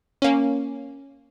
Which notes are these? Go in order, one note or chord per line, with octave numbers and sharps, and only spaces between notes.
A#3 C#4